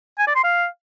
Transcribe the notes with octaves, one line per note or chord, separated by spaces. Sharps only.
G#5
D5
C6
F5